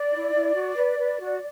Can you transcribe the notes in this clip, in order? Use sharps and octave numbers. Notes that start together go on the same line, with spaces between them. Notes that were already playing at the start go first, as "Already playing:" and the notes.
Already playing: D5
E4
E4
F#4
B4
B4
F#4